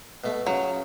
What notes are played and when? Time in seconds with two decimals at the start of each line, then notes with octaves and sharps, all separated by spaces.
0.24 B2 A3
0.47 C#3 F#3